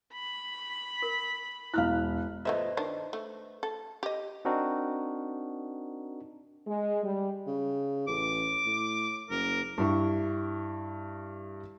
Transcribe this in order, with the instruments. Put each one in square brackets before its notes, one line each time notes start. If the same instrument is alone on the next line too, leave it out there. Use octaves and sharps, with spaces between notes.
[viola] B5
[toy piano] A#4
[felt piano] E1 F6 F#6 [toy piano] E4 F5
[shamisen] F3 A3 E5 [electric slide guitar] B4 C5 D#5
[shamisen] D#3 D4
A3
A4
G4 D#5
[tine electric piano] C4 D4 D#4 F#4 A#4
[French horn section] G#3
G3
[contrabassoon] C#3
[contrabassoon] A1 [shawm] D6
[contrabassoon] A2
[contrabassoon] F#1 [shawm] A#4
[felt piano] G2 E4 C#6